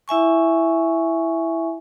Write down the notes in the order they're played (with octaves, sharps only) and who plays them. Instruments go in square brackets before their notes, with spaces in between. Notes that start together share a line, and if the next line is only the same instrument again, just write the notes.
[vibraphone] E4 E5 G#5 C#6